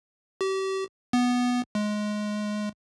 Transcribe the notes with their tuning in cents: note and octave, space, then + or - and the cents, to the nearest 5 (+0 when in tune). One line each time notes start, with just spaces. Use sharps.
G4 -35
B3 -5
G#3 +15